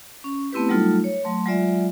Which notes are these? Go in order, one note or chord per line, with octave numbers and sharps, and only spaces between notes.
C#4
A3 B3 C4 E4 G4 B4
F#3 G3 A3 D#4 F4 A4
C#5
F#3 A3 C6
F#3 G#3 F4 D5 E5